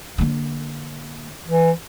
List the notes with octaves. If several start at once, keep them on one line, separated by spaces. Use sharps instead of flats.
D3 A#3
E3